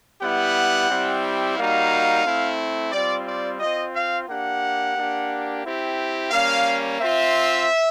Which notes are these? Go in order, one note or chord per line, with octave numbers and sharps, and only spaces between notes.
G3 B3 E4 G4 F#5
G3 C4 E4 G4
G3 A#3 D#4 F#4 F5
A3 C4 E4
G3 C4 F4 D5
D5
C4 F4 D#5
F5
A#3 D4 G4 F#5
A#3 D4 G4
C4 E4 G4
G3 A#3 C#4 F5
C4 F4 E5